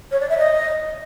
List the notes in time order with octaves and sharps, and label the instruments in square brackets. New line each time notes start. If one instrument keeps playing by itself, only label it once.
[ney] C#5
D5
E5
D#5